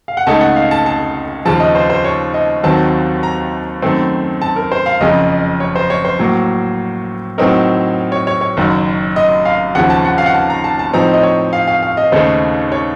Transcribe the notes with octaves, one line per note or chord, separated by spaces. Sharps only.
F5
F#5
C#2 C#3 A3 D#4 A5
F#5
F5
A5
A5
D#2 C#3 F3 A5
D#5
C5
C5
C#5
D#5
D#2 D#3 F#3 C4 A5
A#5
F#2 D#3 A3 C4
A5
A#4
C5
F5
F#1 F2 C#3 D#5
C#5
C5
C#5
C5
A2 F#3 A#3
A2 F#3 C4 D#4 A#4
C#5
C#5
C#5
F#1 F#2 D#3
D#5
F5
D#2 C#3 F3 F#5
A5
F#5
F5
F#5
A5
A#5
A5
A5
A2 F3 C4 D#4 A#5
D#5
C#5
F5
F5
F5
D#5
D#2 C#3 A3 D#4 C5
C#5